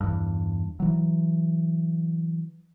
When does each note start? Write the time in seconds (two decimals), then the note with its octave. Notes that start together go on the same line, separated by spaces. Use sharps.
0.01 E2 G2
0.80 E3 F#3